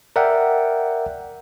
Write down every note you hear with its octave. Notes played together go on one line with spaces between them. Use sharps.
A#4 D5 E5 F#5 G5